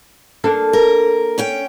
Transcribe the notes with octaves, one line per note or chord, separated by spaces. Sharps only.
A#3 D4 A4
A#4
C#4 C#5 G5